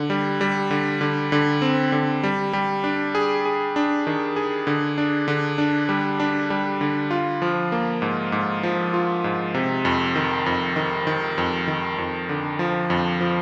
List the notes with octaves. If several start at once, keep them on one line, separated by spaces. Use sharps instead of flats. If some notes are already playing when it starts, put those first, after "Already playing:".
Already playing: D3
G3
G3
D3
D3
D3
C4
D3
G3
G3
D4
G#4
G#4
D4
D#3
G#4
D3
D4
D3
D4
G3
D4
G3
D3
F4
F3
A#3
G#2
G#2
F3
F4
G#2
C3
F2
D#3
F2
D#3
D#3
F2
D#3
F2
D3
F3
F2
F3